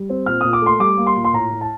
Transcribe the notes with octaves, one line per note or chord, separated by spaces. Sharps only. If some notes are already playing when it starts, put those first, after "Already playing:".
Already playing: G3
C4
A#2 F6
A#2 D#6
D6
A3 C6
G3 D6
A#3
C6
A#2
C6
A2 A#5
A2
A5